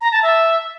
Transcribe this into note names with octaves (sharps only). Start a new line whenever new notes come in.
A#5
A5
E5